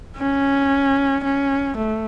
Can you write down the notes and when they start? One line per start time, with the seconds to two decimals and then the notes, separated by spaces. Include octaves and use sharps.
0.17 C#4
1.24 C#4
1.77 A3